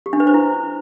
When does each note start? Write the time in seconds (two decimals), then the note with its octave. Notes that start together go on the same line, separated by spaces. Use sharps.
0.06 G4
0.13 D4
0.20 B4
0.27 C5
0.34 E4